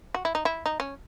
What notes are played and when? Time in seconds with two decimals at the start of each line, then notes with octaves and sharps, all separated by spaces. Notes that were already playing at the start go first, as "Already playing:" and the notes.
0.14 F#4
0.25 E4
0.35 D#4
0.45 E4
0.66 D#4
0.80 C#4